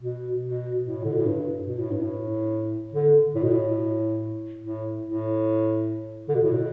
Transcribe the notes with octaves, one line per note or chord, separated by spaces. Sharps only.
B2
B2
A2
D3
B2
A2
G2
B2
A2
G2
A2
D3
A2
B2
A2
A2
A2
D3
B2
A2
B2